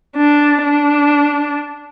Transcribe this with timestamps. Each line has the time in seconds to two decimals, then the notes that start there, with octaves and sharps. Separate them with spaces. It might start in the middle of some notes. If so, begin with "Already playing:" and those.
0.17 D4
0.65 D4